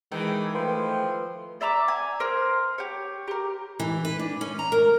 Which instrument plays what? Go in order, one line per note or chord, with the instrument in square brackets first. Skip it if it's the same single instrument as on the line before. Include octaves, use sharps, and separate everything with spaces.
[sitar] D#3 E3 [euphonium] G#3 [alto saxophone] G5
[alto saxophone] F3 [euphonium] A3 [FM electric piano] B4 G5 C6
[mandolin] D5 E5 A#5 D6
G#5
A#4 C5
G4 C#5
G4 A#4
[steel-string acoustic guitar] E3
B4
D4
C#4
A#5
A#4